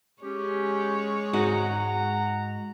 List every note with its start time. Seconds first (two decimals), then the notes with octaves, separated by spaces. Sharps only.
0.22 G#3 C#4 G4 C#5
1.33 G#2 D#4 F#4 F#5 A#5